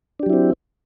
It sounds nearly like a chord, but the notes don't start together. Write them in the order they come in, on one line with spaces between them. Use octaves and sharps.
D4 G4 F#3 E4 C4